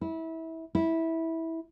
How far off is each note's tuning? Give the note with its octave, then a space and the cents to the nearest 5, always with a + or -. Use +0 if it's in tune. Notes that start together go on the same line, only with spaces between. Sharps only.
E4 -25
E4 -15